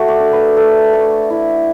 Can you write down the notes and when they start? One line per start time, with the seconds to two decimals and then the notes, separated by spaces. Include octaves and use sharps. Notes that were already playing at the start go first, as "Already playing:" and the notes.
Already playing: A3 F#4
0.08 D5
0.20 D4
0.33 B4
0.57 A3 A4
0.93 A3
1.30 E4